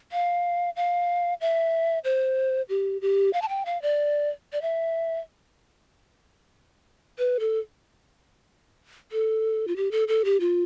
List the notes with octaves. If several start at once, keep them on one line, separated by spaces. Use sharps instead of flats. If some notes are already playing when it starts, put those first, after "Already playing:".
F5
F5
E5
C5
G4
G4
F5
A5
G5
F5
D5
D5
E5
B4
A4
A4
F4
G4
A4
A4
G4
F4